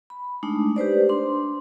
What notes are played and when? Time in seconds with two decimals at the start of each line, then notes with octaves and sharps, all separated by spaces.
0.10 B5
0.43 G#3 A3 D4 D#4
0.76 G4 B4 C5 D5
1.09 D4 C6